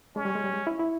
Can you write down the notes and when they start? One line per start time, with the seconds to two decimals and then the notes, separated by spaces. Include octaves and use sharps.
0.16 G#3 C#4
0.25 G3
0.35 G#3
0.44 G3
0.54 G#3
0.67 E4
0.79 E4